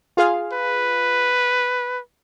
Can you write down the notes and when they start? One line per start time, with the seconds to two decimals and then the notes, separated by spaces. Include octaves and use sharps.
0.17 F4 G#4 F5
0.53 B4